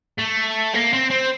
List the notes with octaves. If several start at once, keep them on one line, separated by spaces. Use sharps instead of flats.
A3
A#3
C4
C4